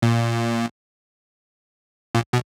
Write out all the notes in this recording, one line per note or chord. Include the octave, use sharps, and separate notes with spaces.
A#2
A#2
B2